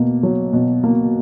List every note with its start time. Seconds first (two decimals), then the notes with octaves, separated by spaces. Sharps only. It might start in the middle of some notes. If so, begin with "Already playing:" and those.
Already playing: B2 A#3
0.23 F#3
0.53 B2
0.84 A#3